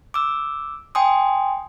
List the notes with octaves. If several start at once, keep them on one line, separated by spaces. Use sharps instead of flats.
D6 E6
G5 G#5 C6 D#6